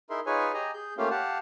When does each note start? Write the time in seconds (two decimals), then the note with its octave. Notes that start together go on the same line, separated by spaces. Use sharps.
0.10 D#4 E4 G#4 A#4 E5 C6
0.26 D#4 F4 G#4 B4 C#5 G#5
0.54 G4 G#4 D#5 G#5 A#5
0.74 G#4 G6
0.98 A3 A#3 C#4 F4 G4 F5
1.10 G4 F5 F#5 A5